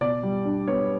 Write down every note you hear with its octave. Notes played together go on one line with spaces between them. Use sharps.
B2 D5
G3
D4
B3 C#5